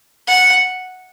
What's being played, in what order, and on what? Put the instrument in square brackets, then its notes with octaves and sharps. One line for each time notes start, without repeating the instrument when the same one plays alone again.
[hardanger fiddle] F#5